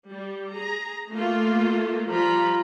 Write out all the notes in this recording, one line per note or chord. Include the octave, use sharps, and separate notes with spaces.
G3
G#4 A#5
A3 A#3 F4
F3 G3 F4 A#5 B5